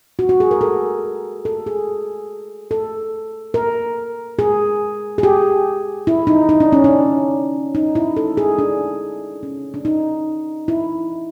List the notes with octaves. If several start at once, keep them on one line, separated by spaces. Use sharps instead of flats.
F#4
F#4
G#4
A#4
A4
A4
G#4
A4
A#4
G#4
G#4
G4
E4
D#4
D#4
D4
C#4
D4
D#4
E4
A4
G#4
D4
C#4
D4
D#4
E4